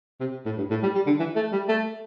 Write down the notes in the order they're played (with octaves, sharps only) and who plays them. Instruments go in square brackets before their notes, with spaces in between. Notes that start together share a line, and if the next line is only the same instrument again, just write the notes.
[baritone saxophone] C3
A2
G2
A2
G3
G3
D3
E3
A3
G3
A3